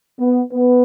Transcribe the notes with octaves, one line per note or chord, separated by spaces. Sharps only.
B3
B3